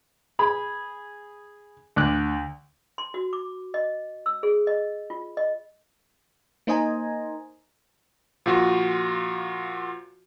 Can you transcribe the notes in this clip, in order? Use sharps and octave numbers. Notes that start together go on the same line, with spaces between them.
G#4 B5
D2 D6 F#6
C6
F#4
D6
D#5
E6
G#4
D#5
F4
D#5
A#3 D#4 C5 D#5 G#5 A#5
A#2 F3 F4 F#4